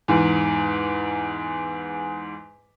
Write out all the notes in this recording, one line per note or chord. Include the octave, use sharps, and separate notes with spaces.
E2 G#2